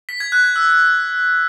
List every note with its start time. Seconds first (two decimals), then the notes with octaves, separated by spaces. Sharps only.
0.09 B6
0.20 G#6
0.32 F#6
0.44 G#6
0.56 E6